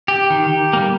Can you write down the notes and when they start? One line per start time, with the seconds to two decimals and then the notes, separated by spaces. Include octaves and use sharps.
0.08 G4
0.30 D#3
0.73 G3 A#3